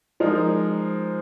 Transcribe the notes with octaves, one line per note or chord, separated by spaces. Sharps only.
F3 G#3 D#4 A#4